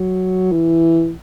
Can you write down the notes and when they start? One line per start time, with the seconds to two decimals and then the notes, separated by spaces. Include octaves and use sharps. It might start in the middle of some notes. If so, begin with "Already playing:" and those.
Already playing: F#3
0.52 E3